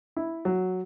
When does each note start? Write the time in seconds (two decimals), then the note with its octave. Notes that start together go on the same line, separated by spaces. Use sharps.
0.16 E4
0.45 F#3